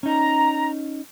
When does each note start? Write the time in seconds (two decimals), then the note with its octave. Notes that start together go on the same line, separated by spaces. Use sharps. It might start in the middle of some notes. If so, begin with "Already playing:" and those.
0.03 C#4 D#4 A#5